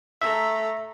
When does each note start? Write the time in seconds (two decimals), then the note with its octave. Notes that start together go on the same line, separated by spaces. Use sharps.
0.21 A3 E5 A#5